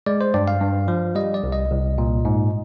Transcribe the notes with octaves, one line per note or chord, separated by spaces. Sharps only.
G#3 D5
C5
G2 D5
F5
G2
F3
G3 D#5
D5
C2
D#5
C2
A#2
G#2